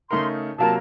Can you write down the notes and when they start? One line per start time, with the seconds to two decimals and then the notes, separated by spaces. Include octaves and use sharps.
0.10 C#3 A3 D#4 A#4 C6
0.58 C3 F#3 A#3 F4 A#4 A5